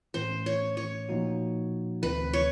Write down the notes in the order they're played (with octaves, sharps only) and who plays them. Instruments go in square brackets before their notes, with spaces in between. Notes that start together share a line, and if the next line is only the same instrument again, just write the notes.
[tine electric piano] A2 E3 A3 C#4 [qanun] C5
[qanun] C#5
C#5
[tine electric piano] A#2 F3 A#3 D#4 F#4
[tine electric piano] D2 C3 E3 A3 C4 [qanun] B4
[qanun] C#5